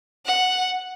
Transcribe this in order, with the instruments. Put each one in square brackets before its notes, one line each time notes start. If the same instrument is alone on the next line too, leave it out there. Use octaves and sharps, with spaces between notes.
[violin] F#5